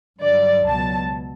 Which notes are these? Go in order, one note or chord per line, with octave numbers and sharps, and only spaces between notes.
G2 D3 F#3 D5
C#2 B2 F#3 A5